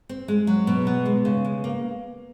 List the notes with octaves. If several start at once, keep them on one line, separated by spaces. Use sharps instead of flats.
C4
G#3
F#3
B2
B3
G#3
C#3
G#3
A#3